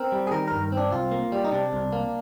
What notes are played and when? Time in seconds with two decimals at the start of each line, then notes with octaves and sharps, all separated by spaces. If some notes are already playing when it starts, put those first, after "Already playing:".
Already playing: C4 A#4
0.12 G3
0.27 G#4
0.31 D#3 A#4
0.48 G2 A#4
0.72 C4
0.77 D4
0.91 C2 F4
1.11 A#3
1.32 G3
1.45 D#4
1.52 C3 D4
1.73 C2
1.92 A#3